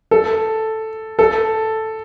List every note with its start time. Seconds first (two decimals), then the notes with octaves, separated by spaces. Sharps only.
0.11 A4
1.19 A4